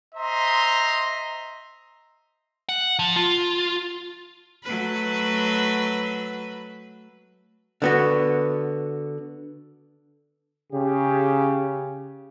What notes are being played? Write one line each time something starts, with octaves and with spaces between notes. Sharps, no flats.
C5 D#5 E5 A#5 C6
F#5
F3
F4
F#3 A3 B4
D3 B3 F#4
C#3 G4